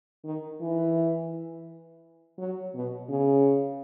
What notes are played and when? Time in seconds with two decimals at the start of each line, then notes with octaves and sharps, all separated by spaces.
0.25 D#3
0.61 E3
2.38 F#3
2.75 B2
3.09 C#3